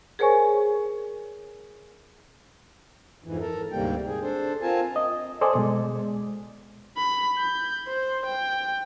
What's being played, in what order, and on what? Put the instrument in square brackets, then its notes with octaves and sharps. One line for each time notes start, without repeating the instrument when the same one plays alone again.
[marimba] G#4 A#4 C5 C#5 G#5 C#6
[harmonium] F2 G#2 E3
A4 A#4
D2 G#2 C3 G3 A#3 G5
G#4
D4 A4 C5
C4 F4 A#4 G#5 A5
[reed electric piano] D#5
A4 C5 D5 D#5 G#5
B2 G#3
[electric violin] B5
G6
C5
G5